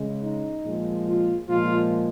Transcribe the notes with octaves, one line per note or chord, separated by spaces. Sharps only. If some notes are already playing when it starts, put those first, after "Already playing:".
Already playing: C#3 G#3
D#4
A#2 F3 G#3
F4
A#2 F3 G#3 F4